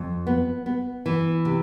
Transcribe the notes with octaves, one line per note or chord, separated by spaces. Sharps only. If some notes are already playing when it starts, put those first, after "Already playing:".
Already playing: F2
B3
B3
E3
C3